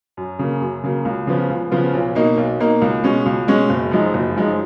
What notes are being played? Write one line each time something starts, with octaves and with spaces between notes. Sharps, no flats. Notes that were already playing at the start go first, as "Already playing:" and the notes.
F#2
C#3 F#3 A#3
F#2
C#3 F#3 A#3
C#2
C#3 F3 B3 F4
C#2
C#3 F3 B3 F4
B1
B2 A#3 D#4
B1
B2 A#3 D#4
C#2
B2 G#3 C#4
C#2
B2 G#3 C#4
F#1
F#2 F3 G#3 D#4
F#1
F#2 F3 G#3 D#4